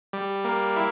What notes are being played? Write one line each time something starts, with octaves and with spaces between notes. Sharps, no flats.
G3
A#3
E4